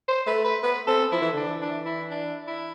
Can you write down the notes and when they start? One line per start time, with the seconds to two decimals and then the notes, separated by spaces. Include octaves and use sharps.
0.08 C5
0.27 A3 B4
0.44 B4
0.63 B3 B4
0.87 C4 A4
1.11 F3 E4
1.22 E3
1.33 D3 D4
1.42 E3
1.61 D4
1.85 E4
2.11 D4
2.47 E4